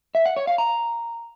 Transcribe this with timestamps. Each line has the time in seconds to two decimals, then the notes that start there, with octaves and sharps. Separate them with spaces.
0.15 E5
0.26 F#5
0.37 C#5
0.47 F5
0.58 A#5